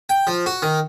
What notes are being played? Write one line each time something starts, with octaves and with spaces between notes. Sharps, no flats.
G5
F3
F#4
D#3